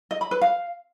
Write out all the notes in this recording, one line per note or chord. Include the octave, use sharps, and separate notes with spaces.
D#5
B5
B4
F5